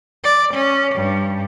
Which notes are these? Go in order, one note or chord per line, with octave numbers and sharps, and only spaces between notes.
D5
C#4
G2